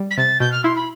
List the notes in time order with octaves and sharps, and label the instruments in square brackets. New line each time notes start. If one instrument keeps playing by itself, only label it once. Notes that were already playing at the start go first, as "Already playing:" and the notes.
Already playing: [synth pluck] G3
[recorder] B6
[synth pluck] C3 [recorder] A6
[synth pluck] B2 [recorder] G6
[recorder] F6
[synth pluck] E4 [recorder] C6
[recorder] B5